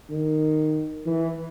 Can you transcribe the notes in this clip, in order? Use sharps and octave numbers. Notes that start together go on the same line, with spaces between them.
D#3
E3